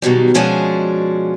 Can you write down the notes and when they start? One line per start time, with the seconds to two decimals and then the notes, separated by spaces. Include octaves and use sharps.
0.02 B2 D#3 F#3 G3
0.34 B2 F3 G#3 C#4 D4 F#4